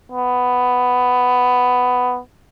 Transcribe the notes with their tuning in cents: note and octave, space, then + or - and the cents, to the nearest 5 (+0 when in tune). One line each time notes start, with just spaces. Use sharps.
B3 +10